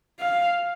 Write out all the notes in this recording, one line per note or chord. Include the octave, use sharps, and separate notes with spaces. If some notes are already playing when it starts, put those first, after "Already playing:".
F5